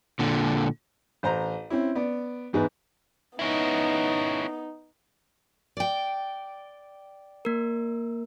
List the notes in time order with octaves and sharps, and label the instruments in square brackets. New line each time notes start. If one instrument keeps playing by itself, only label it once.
[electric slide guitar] A#2 D3
[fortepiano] A1 C5 A#5
C4 C#4 E4
B3 D5
E2 G#2 G#3 B4
[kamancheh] B3 D#4 [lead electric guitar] C#4 E4
[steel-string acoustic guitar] D5 G5
[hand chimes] A#3 A#4